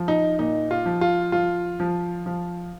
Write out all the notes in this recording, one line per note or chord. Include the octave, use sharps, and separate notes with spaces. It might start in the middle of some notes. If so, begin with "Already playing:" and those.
Already playing: F3
D#4
A#2 D#4
F4
F3
F4
F3 F4
F3
F3